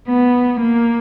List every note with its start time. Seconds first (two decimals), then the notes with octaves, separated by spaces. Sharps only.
0.08 B3
0.60 A#3